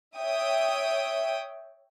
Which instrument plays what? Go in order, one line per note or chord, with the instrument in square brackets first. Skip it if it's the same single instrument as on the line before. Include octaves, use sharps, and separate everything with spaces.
[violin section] C#5 E5 G5 D#6